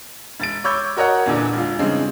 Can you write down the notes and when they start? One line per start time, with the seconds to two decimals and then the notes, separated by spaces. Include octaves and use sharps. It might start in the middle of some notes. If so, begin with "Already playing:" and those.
0.40 E1 A6 D7
0.64 C#5 B5 C#6 D6 E6 G6
0.97 F#4 A#4 C#5 D#5 F#5
1.26 E2 A#2 D3 E3
1.53 E1 F4
1.79 G2 C#3 E3 G#3 C4